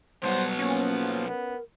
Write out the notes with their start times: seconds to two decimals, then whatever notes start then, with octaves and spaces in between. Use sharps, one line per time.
0.23 B1 G3 B3 C5
0.59 F3 A#3 C#4
1.28 B3 A#4